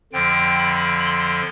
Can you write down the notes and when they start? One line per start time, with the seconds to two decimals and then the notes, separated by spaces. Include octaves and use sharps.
0.13 F2 D3 F3 G5
0.58 B5
1.05 C6